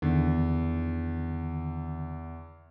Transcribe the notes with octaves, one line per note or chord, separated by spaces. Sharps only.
E2 D3 D#3